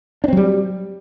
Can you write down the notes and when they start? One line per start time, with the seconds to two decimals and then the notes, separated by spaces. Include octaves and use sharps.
0.24 D4
0.28 C4
0.33 F#3
0.37 G3